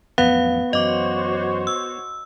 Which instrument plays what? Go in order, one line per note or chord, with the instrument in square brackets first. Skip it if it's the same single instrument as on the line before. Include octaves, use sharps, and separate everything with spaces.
[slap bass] A1 F2 F#3 [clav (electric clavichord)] B3 [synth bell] F5
[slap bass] F#2 E3 [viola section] F#4 C5 C#5 [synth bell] D#5 D6
[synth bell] E6